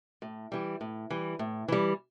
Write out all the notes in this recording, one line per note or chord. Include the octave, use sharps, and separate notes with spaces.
A2
E3 G3
A2
E3 G3
A2
E3 G3